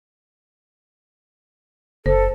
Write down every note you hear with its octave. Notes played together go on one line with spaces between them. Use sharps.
F#1 A4 C5